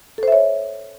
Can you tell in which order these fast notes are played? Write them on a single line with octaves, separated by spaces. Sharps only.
A4 C5 E5 C#5